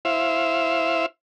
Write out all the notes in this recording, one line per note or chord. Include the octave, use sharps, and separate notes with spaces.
E4 C5 E5 F5